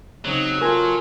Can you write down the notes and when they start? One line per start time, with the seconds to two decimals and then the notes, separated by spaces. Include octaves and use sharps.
0.25 C#3 F#3 C4 D#4
0.61 F4 A4 A#4 G#5